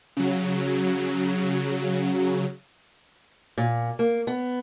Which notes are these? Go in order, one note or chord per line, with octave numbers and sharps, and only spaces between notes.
C#3 F#3
A#2
A#3
B3